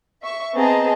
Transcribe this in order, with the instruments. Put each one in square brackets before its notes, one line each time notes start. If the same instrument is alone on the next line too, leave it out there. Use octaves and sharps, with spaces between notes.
[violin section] E5 C#6
B3 C4 G#4 D#5 A5 A#5